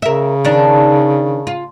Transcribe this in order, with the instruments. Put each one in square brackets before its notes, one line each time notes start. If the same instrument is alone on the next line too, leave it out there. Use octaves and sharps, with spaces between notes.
[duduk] C#3 [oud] A#4 E5
[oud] D#3 D4
F4